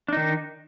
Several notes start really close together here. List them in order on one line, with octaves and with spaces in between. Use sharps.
D4 D#4 D#3